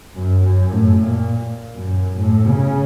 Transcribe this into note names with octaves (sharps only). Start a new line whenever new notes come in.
F#2
F#2
A2
A#2
F#2
A2
C#3